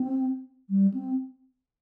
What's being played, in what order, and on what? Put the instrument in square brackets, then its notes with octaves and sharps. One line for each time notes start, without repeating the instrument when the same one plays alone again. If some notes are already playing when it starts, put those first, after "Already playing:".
Already playing: [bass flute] C4
G3
C4